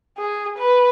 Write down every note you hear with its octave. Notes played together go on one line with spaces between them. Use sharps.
G#4
B4